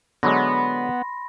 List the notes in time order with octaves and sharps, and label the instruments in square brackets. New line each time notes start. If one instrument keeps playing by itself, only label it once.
[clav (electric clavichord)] D3 F#3 G#3 [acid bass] B3 [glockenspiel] B5 C6 A#6